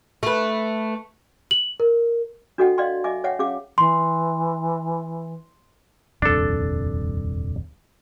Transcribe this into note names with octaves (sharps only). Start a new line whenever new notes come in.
A3 B4
F#7
A#4
D4 F#4 A4 D#5 F#5 G5
D5 D#5 F5 G5 C6
D#5 E5 G#5 D6
C#5 E5 F#5 G5
C#4 G#4 F5 D6
E3 C6
D#1 C2 F2 D4 A4